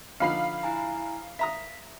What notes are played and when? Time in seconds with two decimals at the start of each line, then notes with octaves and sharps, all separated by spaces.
0.20 D3 F3 D#4 F5 B5 C7
0.63 E4 G#5 A#5
1.39 E5 A#5 D#6 B6